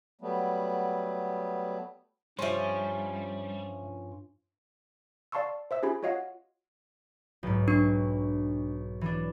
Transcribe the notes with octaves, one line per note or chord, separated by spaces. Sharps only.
F#3 G3 A3 B3
G2 F3 G3 C#4 E5 C6
D5 F5 A5 C6 C#6 E6
C5 E5 E6
C#4 F4 G4 G#4 B5
F4 F#4 C#5 D#5 F5 F#5
B1 G#2
D4 C#6
E3 D4